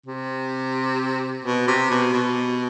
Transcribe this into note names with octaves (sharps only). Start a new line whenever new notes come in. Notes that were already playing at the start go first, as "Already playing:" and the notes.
C3
B2
C3
B2
B2